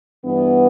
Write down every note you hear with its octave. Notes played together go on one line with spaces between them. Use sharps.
G2 E3 B3